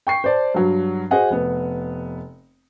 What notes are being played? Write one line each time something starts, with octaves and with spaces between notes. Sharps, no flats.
G5 C#6 C7
C5 D5 A5
G2 F#3
F#4 G#4 C5 D#5 F#5 G#5
F1 B3